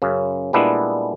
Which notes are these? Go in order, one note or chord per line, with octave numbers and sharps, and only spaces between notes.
F#2 C#3
A#2 G3 G#3 B3 D4 E4